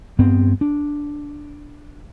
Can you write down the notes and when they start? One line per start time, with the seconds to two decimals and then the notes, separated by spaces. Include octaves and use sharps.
0.19 G2 B3 C4
0.61 D4